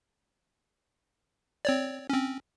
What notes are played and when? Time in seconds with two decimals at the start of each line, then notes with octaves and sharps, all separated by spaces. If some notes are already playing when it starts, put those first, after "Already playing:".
1.65 C4 C#5 D5
2.10 C4 C#4